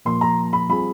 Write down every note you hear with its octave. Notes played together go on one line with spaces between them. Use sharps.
A#2 F3 A#3 C6
A#5
B5
G3 C4 F4 G#4 B5